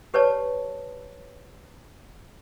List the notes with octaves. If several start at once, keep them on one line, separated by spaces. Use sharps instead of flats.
G4 B4 C#5 D5 A5